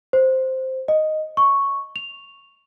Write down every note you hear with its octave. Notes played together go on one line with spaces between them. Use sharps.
C5
D#5
C#6
F7